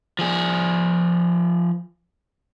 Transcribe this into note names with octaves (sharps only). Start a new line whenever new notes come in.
F3 G#4